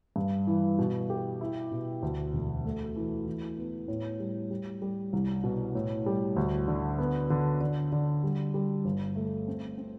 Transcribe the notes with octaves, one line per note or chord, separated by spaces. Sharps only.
G2
E3
B2
G4
E4
B2
D2
E1
A3
E3
E3
B3
A2
G3
G3
G3
C2
B2
A2
G3
D2
D3
B3
D3
D3
D3
G3
G3
G1
A3
C4
C4